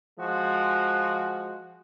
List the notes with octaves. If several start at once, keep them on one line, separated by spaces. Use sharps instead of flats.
F3 G#3 F#4